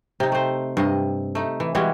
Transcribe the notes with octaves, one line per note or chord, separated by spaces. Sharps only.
C3 D#4
A3 C5
G2 C3 D#5
A3 D#4
E3
E3 G3 G#3 F#4